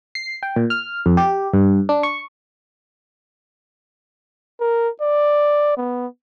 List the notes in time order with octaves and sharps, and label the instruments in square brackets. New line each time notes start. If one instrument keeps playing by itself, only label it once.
[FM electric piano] C7
G5
A#2
F6
F2
G4
G2
D4
C#6
[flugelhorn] A#4
D5
B3